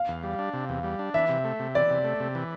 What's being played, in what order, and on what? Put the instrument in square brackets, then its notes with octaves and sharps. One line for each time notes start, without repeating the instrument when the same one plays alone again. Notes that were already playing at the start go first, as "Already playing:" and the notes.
Already playing: [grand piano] F5
[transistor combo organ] E2
G3
D4
C3
E2
G3
D4
[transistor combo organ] E3 [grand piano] E5
[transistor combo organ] C3
A3
C3
[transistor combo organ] E3 [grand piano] D5
[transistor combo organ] C3
A3
C3
E3